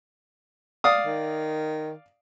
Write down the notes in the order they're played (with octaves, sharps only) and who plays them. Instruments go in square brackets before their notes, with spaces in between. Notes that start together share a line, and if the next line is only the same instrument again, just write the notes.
[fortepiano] D5 F5 D#6
[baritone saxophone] D#3